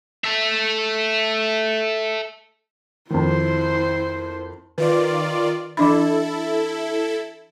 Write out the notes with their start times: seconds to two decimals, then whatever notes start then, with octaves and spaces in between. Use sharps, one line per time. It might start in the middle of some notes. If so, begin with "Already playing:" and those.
0.24 A4 E5
3.10 F2 D#3 E4 C5
4.78 D#3 F4 B4 D5
5.77 E3 D4 E4 A4 B5